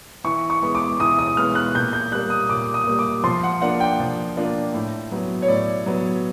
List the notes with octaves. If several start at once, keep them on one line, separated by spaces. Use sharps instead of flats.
E3 C#6
C#6
G#3 B3
D6
E3 D#6
D#6
G#3 B3 F6
F#6
A#2 G6
G6
G3 A#3 F#6
D#6
A#2 D6
D#6
G3 A#3
D6
F3 C6
F#5
A#3 D4 F4 F#5
G5
F3
A#3 D4 F4
A2
F#3 B3
C#5
A2 D5
F#3 B3